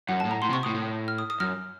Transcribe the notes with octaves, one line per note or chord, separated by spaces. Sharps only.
F#2 F#5
A2 A5
A#5
A2 C6
C3
C#6
A2 D#6
A2
F6
D#6
D#6
F#2 F6